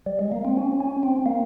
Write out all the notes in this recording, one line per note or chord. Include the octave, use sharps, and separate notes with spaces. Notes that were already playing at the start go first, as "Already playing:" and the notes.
G3
G#3
A#3
C4
C#4
C#4
C4
A#3